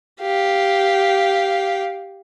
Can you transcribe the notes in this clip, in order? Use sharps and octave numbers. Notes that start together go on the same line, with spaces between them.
G4 F5